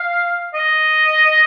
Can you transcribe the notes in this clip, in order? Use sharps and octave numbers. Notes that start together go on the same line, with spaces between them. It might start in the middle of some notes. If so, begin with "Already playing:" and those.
Already playing: F5
D#5